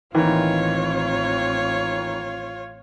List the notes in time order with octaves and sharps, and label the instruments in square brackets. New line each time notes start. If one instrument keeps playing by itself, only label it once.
[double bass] A1 C4 [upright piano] D#2 D#3 E3 [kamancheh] F4 C#5